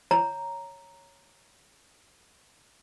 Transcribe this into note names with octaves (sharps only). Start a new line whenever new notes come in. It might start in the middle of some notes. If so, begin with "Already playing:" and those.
C#5 A#5